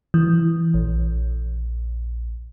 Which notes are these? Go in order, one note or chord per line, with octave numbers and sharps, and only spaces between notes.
E3
A#1